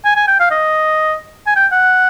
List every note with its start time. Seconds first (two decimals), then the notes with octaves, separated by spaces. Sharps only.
0.05 G#5
0.16 G#5
0.28 G5
0.40 F5
0.51 D#5
1.47 G#5
1.56 G5
1.72 F#5